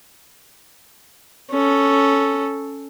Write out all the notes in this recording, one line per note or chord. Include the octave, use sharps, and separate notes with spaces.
C#4 A4